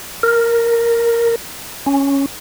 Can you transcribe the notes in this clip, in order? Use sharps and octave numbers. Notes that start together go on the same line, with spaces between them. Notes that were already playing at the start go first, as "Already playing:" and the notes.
A#4
C#4